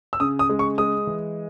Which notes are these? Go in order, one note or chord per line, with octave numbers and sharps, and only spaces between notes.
E6
C#3 D#6
D#6
G#3
C#6
G#3 D#6
E3